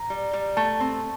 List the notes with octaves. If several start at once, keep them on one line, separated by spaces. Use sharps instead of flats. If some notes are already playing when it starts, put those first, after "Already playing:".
Already playing: A#5
G3
G3
A3 A5
C4